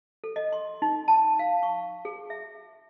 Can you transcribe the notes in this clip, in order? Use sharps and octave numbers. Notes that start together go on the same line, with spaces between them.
A4
D#5
C6
D#4
A5
F5
C#6
G#4
E5